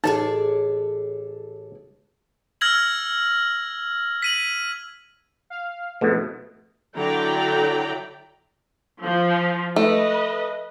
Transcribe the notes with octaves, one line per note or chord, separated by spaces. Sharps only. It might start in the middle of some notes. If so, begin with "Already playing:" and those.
A1 D#4 G#4 A4 D5 A5
E6 F6 G#6 A#6 F#7
B6 D#7 F#7
F5
F2 G#2 B2 A3
D3 F#3 E4 D5 G5 A#5
F3
A3 B4 D#5